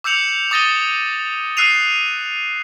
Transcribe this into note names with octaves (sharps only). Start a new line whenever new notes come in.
D6 E6 G6 C#7 F7 F#7
D6 D#6 A6 A#6 D#7 G7
E6 F#6 C7 D#7 F7